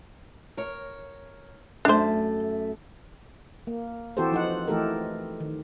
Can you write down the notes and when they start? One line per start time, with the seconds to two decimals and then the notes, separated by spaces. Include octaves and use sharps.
0.57 A#4 C#5
1.85 F#2 A3 D4 C5
3.67 A#3
4.17 E3 C4 F#4 G4 A4 C5
4.32 F3 D#4 F#5
4.68 E3 A3 D#4 G4 A4 A#4
5.40 D#3